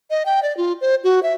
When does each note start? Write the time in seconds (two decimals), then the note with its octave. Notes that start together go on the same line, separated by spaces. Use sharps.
0.10 D#5
0.26 G5
0.43 D5
0.57 F4
0.81 C5
1.04 F#4
1.23 E5